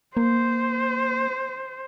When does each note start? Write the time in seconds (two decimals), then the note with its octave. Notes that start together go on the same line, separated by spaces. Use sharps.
0.17 A#3 C5